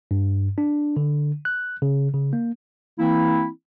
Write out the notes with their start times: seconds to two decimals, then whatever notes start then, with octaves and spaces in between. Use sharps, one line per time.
0.11 G2
0.58 D4
0.97 D3
1.45 F#6
1.82 C#3
2.14 C#3
2.33 A#3
2.99 E3 A#3 C4 E4